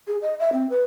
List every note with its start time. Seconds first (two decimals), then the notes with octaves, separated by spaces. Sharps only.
0.07 G#4
0.22 D#5
0.39 E5
0.53 C4
0.70 B4